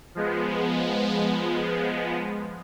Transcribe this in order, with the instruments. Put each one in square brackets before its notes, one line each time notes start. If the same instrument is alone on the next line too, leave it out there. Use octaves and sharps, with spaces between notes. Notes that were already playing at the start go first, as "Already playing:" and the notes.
[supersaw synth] F3 G#3 B3